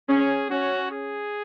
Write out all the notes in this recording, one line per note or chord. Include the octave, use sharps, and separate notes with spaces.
C#4 G#4
C#4 F#4
G#4